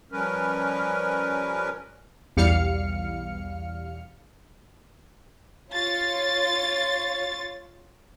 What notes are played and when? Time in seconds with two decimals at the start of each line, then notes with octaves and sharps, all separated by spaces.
0.12 F3 G3 C#4 A#4 B4
2.37 B1 E2 G3 F5 F6 C#7
5.73 F4 C#5 A6